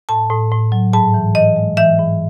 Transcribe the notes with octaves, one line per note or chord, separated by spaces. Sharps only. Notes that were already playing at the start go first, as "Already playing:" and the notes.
A2 A5
A2
A2
F#3
G#2 A5
E3
E3 D#5
G#3
E3 E5
G#2